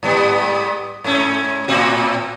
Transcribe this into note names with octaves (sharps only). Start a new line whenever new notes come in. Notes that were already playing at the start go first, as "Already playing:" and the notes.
G#2 G3 B3
G#2 A3 C#4
A2 C4 F#4